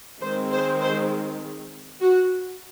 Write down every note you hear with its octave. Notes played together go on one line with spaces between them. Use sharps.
D#3 G#3 C4 C5
C5
C5
F#4